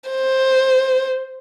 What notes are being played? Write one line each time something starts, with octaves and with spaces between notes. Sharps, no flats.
C5